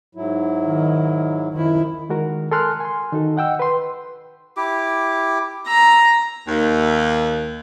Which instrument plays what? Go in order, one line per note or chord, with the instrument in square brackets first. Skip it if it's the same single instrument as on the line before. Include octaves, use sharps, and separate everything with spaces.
[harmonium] G#2 F#3 E4
[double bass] D#3
[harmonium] F#2 F3 [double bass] D#3 E4
[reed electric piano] D#3 G#3 F#4 A#4
A4 A#4 G#5 C6 F6 F#6
G#5 C6
D#3 D#4 F#4 A4
D#5 F#5 G5 E6
B4 C6
[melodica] E4 G4 D6
[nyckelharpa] A#5 [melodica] E6
[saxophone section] D#2